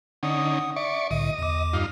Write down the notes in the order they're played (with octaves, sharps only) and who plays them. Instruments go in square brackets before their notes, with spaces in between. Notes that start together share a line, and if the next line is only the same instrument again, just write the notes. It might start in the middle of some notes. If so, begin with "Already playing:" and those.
[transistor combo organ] D3 C#4 D#4 [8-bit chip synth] F#5 D#6
[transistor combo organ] D5 C#6 [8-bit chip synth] E5
[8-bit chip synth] C2 A2 D3 [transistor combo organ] D#5
[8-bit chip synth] E2 D6
[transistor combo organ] G2 D#4 F4